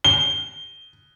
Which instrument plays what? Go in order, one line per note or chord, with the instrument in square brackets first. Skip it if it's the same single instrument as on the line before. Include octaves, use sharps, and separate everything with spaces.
[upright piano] G7